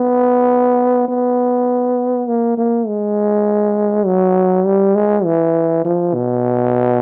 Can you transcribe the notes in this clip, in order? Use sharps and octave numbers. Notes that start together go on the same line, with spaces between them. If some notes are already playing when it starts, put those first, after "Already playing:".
Already playing: B3
B3
A#3
A#3
G#3
F#3
G3
G#3
E3
F3
B2